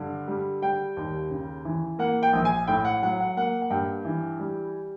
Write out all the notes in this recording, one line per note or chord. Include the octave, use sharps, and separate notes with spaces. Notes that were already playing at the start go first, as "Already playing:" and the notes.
Already playing: G2 D3
G3
G3 G5
D#2
C#3
E3
A#3 F#5
G5
A#1
G#5
A2 G5
F#5
F#3 F#5
F#5
A#3 F#5
F#5
G2 G5
E3
G3